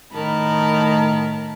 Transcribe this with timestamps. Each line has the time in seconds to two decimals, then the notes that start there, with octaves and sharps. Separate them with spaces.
0.13 A2 D#3 A#4 A5 B5